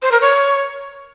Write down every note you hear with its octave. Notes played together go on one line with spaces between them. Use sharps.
C5
A#4
C#5